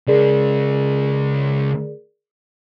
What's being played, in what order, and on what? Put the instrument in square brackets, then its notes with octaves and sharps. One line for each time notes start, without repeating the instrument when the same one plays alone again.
[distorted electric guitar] C#3 G#3 [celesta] G#4 A#4 D5